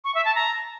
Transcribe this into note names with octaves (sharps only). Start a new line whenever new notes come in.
C#6
E5
A5
A#5